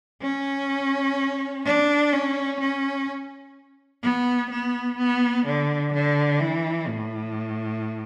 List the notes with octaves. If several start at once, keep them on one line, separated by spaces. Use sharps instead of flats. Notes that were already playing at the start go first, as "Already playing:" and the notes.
C#4
D4
C#4
C#4
B3
B3
B3
D3
D3
E3
A2